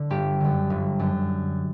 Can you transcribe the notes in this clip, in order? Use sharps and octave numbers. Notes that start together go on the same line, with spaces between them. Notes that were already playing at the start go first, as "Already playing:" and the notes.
Already playing: D3
G1 G4
F#2 D3
G1
F#2 D3